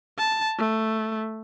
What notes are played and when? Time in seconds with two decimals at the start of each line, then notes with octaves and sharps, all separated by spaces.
0.18 A5
0.58 A3